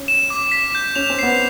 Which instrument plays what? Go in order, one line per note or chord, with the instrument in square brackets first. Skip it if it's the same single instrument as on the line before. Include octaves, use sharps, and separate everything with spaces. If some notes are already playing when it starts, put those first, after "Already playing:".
Already playing: [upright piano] C#4
[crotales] E7
D6
B6
G6
[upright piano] C#4 [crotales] F7
[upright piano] C4
[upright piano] B3 [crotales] C7